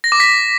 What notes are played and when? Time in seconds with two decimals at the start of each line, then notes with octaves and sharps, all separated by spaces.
0.04 A#6
0.12 D6
0.20 B6